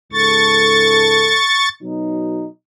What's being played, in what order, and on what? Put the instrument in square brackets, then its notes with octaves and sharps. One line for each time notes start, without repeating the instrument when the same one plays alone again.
[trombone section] C#2 G#2 A4 [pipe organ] C#6 A6
[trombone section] B2 F#3 D#4